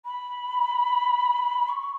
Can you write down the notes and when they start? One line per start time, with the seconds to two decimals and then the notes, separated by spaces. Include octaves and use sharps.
0.05 B5
1.68 C#6